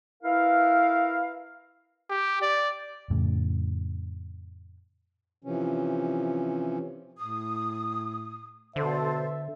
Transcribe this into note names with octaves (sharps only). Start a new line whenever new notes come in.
E4 A#4 B4 F5
G4
D5
F2 A2 C#3
C3 E3 F3 C#4
A2 D#6
B2 D3 A4 C5 E5